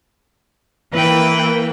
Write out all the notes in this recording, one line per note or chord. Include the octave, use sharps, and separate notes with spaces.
E3 A#3 B4 G5